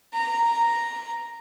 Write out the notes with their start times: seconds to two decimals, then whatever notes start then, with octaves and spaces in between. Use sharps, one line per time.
0.14 A#5